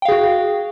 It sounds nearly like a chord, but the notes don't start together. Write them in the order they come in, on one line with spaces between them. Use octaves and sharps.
G5 F5 G#4 F#4